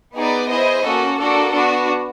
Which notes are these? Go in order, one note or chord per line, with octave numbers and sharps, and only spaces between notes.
B3 D#4 G#4 B4 D5
E4 G#4 C5 D#5
A#3 C#4 F#4 A4
A#3 D4 F#4 A4
B3 D4 F#4